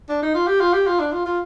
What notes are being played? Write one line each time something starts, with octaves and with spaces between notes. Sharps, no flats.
D4
D#4
F4
G4
F4
G4
F4
D4
F4
F4